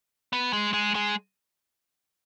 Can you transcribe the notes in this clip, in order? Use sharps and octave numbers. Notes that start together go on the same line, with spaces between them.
B3
G#3
G#3
G#3